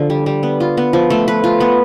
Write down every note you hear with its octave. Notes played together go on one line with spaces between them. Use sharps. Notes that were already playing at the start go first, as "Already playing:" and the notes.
Already playing: D3 F3
G3
G3
B3
F4
B3
F3
A3
B4
F4
B3